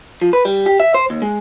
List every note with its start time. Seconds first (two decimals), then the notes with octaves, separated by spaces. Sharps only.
0.22 F3
0.33 B4
0.45 G3
0.66 G4
0.80 E5
0.94 C5
1.10 D#2
1.22 G#3